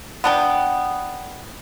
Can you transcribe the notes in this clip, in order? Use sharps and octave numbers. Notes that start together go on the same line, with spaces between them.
B3 D4 G5